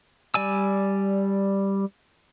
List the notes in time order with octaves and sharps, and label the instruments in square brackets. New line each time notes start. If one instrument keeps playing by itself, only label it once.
[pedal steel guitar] G3 D5 G#5 E6